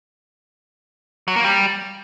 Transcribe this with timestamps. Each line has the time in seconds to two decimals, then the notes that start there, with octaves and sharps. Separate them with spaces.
1.28 F#3
1.36 A#3
1.44 G3